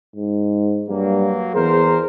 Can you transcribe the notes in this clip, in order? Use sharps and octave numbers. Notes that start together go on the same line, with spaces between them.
G#2
G2 F#3 A#3
E2 G#4 A#4 C5